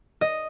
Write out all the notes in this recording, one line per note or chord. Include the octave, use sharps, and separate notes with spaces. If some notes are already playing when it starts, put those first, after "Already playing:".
D#5